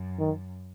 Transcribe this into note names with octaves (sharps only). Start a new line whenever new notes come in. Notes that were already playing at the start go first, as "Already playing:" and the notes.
Already playing: F#2
D#3